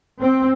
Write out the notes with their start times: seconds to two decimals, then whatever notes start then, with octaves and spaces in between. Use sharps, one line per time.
0.21 C4